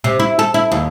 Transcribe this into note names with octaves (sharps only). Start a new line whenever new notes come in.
C3
E4
A4
E4
D#2